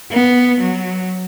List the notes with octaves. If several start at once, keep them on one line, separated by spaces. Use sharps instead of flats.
B3
F#3